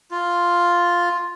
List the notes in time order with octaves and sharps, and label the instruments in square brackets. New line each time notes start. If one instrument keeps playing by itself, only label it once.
[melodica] F4